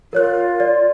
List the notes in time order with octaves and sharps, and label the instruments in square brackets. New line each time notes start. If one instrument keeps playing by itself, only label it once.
[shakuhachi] F4 [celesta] A#4 C#5 F#6
[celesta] D5